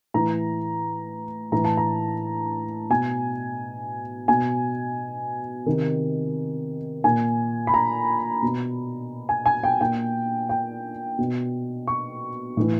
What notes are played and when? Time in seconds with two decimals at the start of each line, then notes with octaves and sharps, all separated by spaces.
0.14 A2 E3 A#5
1.52 A2 E3 A#5
1.65 A5
1.77 A#5
2.90 B2 G#5
4.28 B2 G#5
5.66 C3 D#3
7.04 A#2 G#5
7.67 B5
7.74 A#5
8.42 B2
9.29 G#5
9.46 G#5
9.64 G5
9.81 A#2 G5
10.49 G5
11.19 B2
11.88 C#6
12.57 A2 E3